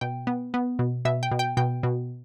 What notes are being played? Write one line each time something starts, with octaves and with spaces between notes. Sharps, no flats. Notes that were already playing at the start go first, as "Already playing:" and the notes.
B2 G5
B3
B3
B2
B2 E5
G5
B2
G5
B2 G5
B2